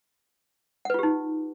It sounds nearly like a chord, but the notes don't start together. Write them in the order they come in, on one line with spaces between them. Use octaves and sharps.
F#5 B4 F4 G4 D#4